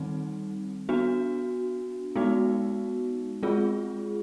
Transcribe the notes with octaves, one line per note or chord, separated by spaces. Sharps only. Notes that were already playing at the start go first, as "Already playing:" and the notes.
Already playing: D#3 G3 C4 D#4
B3 D4 F#4
G#3 B3 D#4 F#4
G#3 C4 F4 G#4